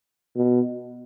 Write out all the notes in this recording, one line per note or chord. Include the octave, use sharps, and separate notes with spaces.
B2